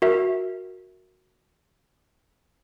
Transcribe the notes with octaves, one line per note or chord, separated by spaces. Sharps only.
F#4 A#4 E5